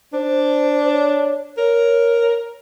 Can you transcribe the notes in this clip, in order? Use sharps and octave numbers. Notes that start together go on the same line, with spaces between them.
D4 C5
C#5
A#4 C#5